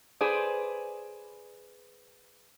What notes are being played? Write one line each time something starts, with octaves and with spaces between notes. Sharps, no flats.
G#4 B4 C5 D5